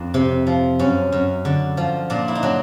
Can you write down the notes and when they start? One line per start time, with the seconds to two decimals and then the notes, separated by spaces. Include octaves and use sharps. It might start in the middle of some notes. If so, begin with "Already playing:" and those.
Already playing: F2 D4
0.14 C3
0.47 F3
0.79 F#2 C#4
1.12 F#2
1.45 D3
1.77 F3
2.10 A#2 D4
2.28 E4
2.35 D#4
2.43 F#3 D4